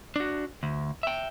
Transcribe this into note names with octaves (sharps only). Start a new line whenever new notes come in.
D4 F#4
D2
E5 G5